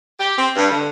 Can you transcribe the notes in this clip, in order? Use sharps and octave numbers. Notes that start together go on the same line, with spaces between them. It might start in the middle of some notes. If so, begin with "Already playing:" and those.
G4
C4
G2
D3